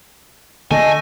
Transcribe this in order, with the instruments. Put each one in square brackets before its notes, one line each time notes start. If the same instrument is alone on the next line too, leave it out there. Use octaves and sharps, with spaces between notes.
[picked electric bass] D3 [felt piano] A3 [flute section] D#5 A5 [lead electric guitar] G#5